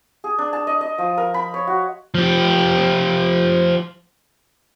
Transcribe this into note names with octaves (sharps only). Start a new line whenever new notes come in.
G#4
D4
A5
D#5
D#5
F3
A#4
B5
C#5
F#4
F3 G4